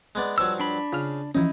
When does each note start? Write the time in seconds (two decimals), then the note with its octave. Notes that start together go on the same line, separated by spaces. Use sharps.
0.15 G#3 B3 D5
0.38 G2 F3 F#3 E6
0.60 D4 B5
0.93 C#3 F4 F6
1.35 E3 F3 C#4 D#4 E4